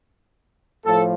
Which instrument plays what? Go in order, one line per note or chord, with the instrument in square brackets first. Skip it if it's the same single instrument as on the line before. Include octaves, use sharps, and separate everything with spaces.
[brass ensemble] A2 F3 A4